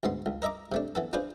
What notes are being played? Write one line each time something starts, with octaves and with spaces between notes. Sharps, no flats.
D2 G#2 B3 C6
C#2
A#4 D#5 E5 A#5 D6
C3 A3 D4
E3 B3 A4
D4 F4 G#4 B4 C5